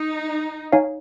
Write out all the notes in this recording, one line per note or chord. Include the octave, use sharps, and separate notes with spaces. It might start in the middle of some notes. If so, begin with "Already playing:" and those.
Already playing: D#4
D#4 C#5 F5 G#5